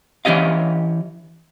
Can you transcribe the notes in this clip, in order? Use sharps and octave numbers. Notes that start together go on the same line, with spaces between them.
E3 C#4 G4 D#5 F5